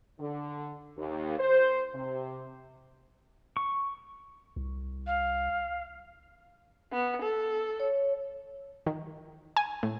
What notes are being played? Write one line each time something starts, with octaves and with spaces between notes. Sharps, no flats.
D3
D#2
C5
C3
C#6
C2
F5
B3
A4
C#5
D#3
G#5
A2